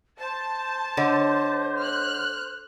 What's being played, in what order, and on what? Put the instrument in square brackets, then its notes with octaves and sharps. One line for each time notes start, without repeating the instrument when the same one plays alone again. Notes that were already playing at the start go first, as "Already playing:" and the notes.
[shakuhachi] C5 [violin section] A5
[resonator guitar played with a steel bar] D3 [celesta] C#5 D#5 F#5
[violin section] F6 F#6